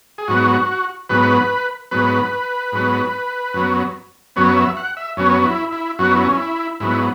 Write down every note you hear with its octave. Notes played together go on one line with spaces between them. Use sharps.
G#4
G#2 F#3 B3 F#4
G#2 F#3 B3 B4
G#2 F#3 B3 B4
G#2 F#3 B3
F#2 F#3 B3
F#2 F#3 B3 C#5
E5
F#5
E5
F#2 F#3 B3 C#4
E4
E4
F#2 F#3 B3 F#4
E4
C#4
E4
G#2 F#3 B3 E4